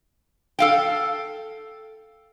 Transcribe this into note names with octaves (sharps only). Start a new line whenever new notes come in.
A4 F5 G5